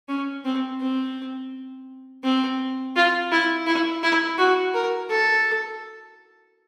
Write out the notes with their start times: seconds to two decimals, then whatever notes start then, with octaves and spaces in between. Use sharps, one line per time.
0.09 C#4
0.45 C4
0.80 C4
2.24 C4
2.96 F4
3.32 E4
3.67 E4
4.03 E4
4.38 F#4
4.74 A#4
5.10 A4